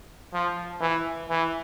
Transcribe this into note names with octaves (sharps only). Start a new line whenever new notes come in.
F3
E3
E3